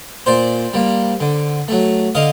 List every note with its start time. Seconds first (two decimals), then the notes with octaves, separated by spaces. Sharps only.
0.26 A#2 C5 D5
0.74 G3 A#3
1.20 D3
1.68 F#3 A3
2.15 D3 D#5 F5